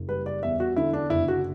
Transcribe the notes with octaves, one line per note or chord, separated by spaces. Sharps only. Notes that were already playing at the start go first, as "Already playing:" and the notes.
Already playing: F#1
G3 B4
D5
E2 E5
F#4
D3 E4
D4
F#1 E4
F#4